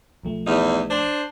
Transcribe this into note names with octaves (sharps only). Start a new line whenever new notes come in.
B1 F3 A3
E2 G3 D#4
D4 C5